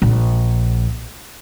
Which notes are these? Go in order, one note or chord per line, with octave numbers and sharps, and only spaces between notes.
A#1